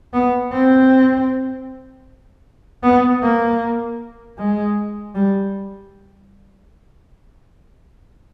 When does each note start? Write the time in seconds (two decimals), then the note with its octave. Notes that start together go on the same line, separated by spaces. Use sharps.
0.14 B3
0.52 C4
2.83 B3
3.22 A#3
4.38 G#3
5.15 G3